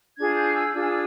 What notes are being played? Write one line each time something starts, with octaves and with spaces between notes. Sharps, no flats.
D4 F4 G#4 G#6
G6
E6
D4 F4 G#4 E6